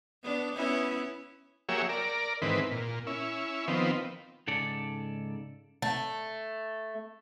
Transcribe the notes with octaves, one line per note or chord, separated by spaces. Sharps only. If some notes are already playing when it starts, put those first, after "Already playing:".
B3 D4
B3 C#4 E4
F#3 A#3 G4 G#4 C#5 E5
A#4 D5
G#2 D#3 E3 C4 B4
A#2
C#4 E4
D#3 F3 B3 C4
G#2 C#3 A4 D5
A3